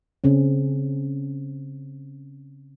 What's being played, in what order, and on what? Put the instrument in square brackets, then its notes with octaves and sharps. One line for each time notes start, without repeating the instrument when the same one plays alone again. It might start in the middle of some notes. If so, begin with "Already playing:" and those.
[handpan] C#3 C4 C#4